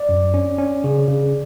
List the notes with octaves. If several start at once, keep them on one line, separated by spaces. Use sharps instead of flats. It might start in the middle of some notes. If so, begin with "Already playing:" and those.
Already playing: D5
F#2
C#4
C#4
C#3
C#3